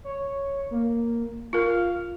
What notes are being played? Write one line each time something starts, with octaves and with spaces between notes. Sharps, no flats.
C#5
A#3
F4 A#4 F5